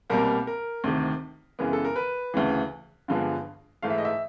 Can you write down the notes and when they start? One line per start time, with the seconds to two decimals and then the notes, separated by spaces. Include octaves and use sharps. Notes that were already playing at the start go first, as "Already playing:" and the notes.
0.10 C2 B2 G3 A#3 A#4
0.47 A#4
0.84 D2 C3 D#3
1.59 F#2 C#3 E3 G#3 B3 A#4
1.73 A4
1.85 A#4
1.96 B4
2.34 D2 C#3 E3
3.08 G2 D3 F3 G#3 B3
3.82 G#2 E3 A3 F5
3.90 E5
3.98 D#5
4.05 E5